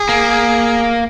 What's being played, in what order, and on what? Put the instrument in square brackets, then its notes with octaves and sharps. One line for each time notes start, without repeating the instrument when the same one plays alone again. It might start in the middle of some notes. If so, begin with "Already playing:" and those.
Already playing: [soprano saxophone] G#4
[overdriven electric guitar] A#3